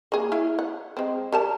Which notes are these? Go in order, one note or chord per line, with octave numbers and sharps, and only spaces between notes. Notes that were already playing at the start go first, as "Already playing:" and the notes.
A#3 G#4
E4 C#5 F5
F#5
G#3 C4
G3 A#4 A5